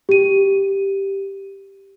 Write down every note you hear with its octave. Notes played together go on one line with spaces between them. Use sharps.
G4 D#7